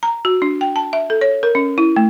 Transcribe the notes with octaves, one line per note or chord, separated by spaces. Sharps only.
A#5
F#4
D4
G5
A5
E5
A4
C#5
A#4
C#4
E4
A3